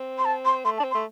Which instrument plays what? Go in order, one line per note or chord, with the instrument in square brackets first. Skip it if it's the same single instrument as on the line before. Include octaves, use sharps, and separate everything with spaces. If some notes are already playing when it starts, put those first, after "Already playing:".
Already playing: [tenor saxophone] C4
[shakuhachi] C6
A5
C6
[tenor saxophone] A3 [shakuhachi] C6
[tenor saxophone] D4 [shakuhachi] A5
[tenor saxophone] C4
[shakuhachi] C6
[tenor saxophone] A3